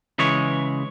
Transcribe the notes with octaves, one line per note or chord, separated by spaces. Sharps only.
C#3 E3 G#3 C#5